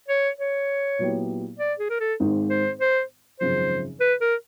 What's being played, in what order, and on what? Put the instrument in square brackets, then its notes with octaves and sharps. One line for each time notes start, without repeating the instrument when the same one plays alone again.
[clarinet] C#5
C#5
[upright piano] A#2 F#3 B3 E4 G4
[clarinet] D5
G#4
A#4
A4
[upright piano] G#1 G#2 D#3 G#3
[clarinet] C5
C5
[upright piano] G#1 F#2 C#3 F3 [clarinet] C5
[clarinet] B4
A#4